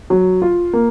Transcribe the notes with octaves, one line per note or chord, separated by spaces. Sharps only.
F#3
F4
A#3